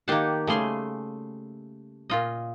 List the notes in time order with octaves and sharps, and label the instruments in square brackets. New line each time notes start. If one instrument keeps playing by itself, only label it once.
[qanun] D#3 G4 F#5 [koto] A#3 A5
[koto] C#3 G3 G#4 [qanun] A3 C6
[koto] A#2 F4 D#5